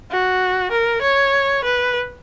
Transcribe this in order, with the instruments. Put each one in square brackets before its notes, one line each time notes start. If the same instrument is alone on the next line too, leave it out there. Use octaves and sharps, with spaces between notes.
[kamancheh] F#4
A#4
C#5
B4